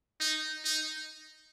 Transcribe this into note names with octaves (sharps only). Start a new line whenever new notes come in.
D#4
D#4